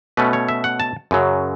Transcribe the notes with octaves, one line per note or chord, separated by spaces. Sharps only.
B2 A3 C#4 B4
C#5
E5
F#5
A5
F#2 C#3 F#3